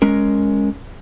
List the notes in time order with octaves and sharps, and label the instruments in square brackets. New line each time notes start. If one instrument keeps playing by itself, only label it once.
[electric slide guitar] G#3 C#4 A#4